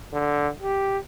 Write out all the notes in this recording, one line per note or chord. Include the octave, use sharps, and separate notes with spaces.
D3
G4